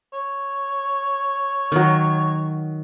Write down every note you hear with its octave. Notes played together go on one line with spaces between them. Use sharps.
C#5
D#3 F#3